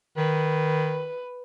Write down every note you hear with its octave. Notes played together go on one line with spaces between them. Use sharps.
D#3 B4